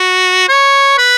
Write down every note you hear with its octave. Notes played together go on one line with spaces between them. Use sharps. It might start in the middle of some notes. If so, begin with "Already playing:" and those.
Already playing: F#4
C#5
B4